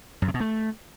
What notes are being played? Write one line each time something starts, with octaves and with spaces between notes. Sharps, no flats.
F#2
C3
B2
A3